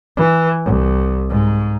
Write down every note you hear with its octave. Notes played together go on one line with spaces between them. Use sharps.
E3
C2
G#2